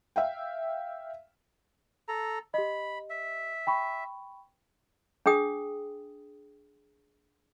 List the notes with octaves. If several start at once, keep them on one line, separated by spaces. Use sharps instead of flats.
E5 F5 G5
A4 A#5
G4 D#5 B5
E5
G5 B5 C#6
D4 G#4 G5 D#6